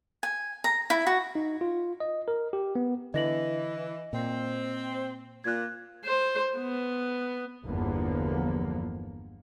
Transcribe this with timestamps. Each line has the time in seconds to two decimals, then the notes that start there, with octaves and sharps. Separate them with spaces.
0.23 G#5
0.64 A#5
0.90 E4
1.07 F#4
1.35 D#4
1.61 F4
2.00 D#5
2.28 A#4
2.53 G4
2.75 B3
3.14 D3 E3 D#5 A#6 F#7
4.13 A#2 C4
5.44 A#2 F#6 G#6
6.05 C5
6.58 B3
7.66 G1 E2 D3 F3 A#3 B3